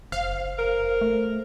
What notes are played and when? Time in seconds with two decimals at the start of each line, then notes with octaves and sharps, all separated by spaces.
0.12 F#1 C5 F5
0.59 A#4
1.01 A3